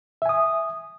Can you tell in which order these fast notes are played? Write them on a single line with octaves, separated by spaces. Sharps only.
E5 G#5 D#6